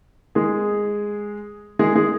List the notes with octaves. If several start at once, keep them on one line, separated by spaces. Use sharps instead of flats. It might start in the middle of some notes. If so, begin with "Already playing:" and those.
G#3 G#4
G#3 G#4
G#3 G#4